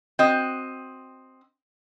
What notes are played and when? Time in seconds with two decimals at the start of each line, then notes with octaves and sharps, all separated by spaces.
0.19 C4 F#4 D#5